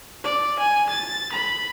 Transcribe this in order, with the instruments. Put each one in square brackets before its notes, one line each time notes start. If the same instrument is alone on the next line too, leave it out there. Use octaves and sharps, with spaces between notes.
[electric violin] D5
G#5
A6
B5